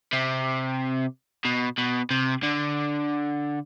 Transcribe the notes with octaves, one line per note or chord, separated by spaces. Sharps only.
C3
B2
B2
C3
D3